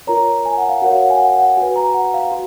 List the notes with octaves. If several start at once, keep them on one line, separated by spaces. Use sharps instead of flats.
F4 A#4 C#5 A#5
G#5
F#5
F5
F#4 A#4 C#5 F#5
F5
F#5
G#5
F#5
F#5
F#4 B4 G#5
A#5
F#5
F5
F#4